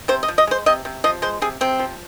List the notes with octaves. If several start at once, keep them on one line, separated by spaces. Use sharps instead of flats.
C3 C5
D#5
F3
D#5
G#3 C5
C3 D#5
C3
F3 D#5
G#3 C5
C3 G#4
C3 C4
F3